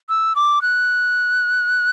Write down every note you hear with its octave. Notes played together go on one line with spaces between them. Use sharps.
E6
D6
F#6